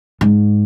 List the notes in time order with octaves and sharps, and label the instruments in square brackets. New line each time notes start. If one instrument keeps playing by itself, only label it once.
[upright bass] G#2